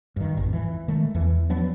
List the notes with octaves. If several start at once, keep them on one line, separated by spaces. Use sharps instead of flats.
G2 D#3
G#1 F2
E3
D#3 G#3 A3
E2 E3
F3 F#3 B3 D4